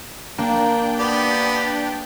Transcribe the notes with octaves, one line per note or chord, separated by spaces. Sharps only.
A#3 D4 G5
B3 G4 D5